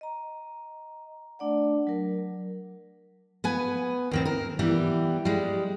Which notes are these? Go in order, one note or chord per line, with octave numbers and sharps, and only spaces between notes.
D#5 A#5
A3 D4 D5 F#5
F#3 A#4
B3 B4 G#5
D#2 D#3 C4
A#4
E3 G3 B3 G4
G3 G#3